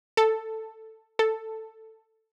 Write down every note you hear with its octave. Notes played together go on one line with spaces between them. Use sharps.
A4
A4